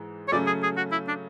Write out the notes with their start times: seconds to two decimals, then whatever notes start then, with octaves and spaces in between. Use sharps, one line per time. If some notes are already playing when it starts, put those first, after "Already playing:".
Already playing: G#2 E3 G#3
0.28 C#5
0.32 C#3 F#3 A3 C#4 D5
0.47 G#4
0.63 G#4
0.77 F#4
0.92 E4
1.08 D4